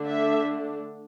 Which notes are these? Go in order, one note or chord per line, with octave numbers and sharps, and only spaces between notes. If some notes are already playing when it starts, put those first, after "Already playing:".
Already playing: D3 A3 D4
E5